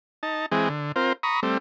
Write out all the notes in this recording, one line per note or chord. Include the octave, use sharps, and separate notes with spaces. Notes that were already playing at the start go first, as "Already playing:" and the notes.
D#4 A5
E3 G#3 C4 G#4
D3
C4 F4 A#4 C5
A#5 B5 C#6 D#6
G3 A3 C4